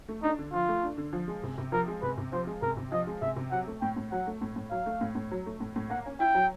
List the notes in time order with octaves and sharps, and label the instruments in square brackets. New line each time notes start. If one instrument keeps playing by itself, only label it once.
[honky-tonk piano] A3
[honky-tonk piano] D4 [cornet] D#4
[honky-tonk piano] D3
[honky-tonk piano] F3 [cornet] F4
[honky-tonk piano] A3
D4
D3
F3
G#3
C3
C3
[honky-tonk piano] F3 [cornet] A#4
[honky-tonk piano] G#3
[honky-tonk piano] C3 [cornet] B4
[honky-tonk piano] C3
[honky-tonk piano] F3 [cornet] C5
[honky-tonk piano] G#3
[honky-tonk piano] C3 [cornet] A#4
[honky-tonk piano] C3
[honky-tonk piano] F3 [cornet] D#5
[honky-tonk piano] G#3
[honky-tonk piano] C3 [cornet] E5
[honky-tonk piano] C3
[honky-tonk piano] F#3 [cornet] F#5
[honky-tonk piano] A3
[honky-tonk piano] A2 [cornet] G5
[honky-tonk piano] A2
[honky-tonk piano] F#3 [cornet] F#5
[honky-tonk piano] A3
A2
A2
[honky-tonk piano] F#3 [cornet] F5
[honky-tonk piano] A3
A2
A2
F#3
A3
A2
A2
[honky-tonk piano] A#3 [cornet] F#5
[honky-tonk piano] C#4
[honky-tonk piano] E4 [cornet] G5
[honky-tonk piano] F#3